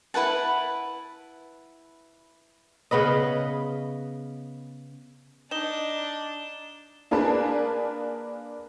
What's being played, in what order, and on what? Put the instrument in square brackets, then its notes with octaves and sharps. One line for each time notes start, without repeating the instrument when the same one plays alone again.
[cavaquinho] E4 B4 F#5 A5
[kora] C#3 B3 B4 D#5
[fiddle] D4 [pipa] D#4 [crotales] E7 G7
[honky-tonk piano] A#3 D4 G#4 A#4 B4 A5